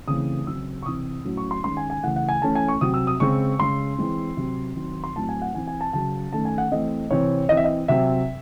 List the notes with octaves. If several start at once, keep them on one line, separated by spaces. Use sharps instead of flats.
C#3 E3 A3 C4 D#6
C#3 F#3 C4 E6
C#6
C3 E3 C4 D#6
A2 F#3 C#4
C#6
C6
D#3 G#3 C#4 C6
G#5
G#5
C#3 E3 A3 F#5
F#5
G#5
E3 A3 C#4 A5
G#5
C#6
C3 F#3 C4 D#6
E6
D#6
C#3 G#3 C4 C#6
C#3 G#3 C#4 C6
E3 G#3 C4
C3 F#3 C4
D#3 F#3 C4
C6
A2 F#3 C4 A5
G#5
F#5
E3 C4 G#5
G#5
A5
C#3 F#3 C#4 A5
D#3 A3 C#4 A5
G#5
F#5
E3 A3 C4 D#5
C3 E3 C4 C#5
E3 C4 D#5
E5
D#5
C3 F#3 C4 E5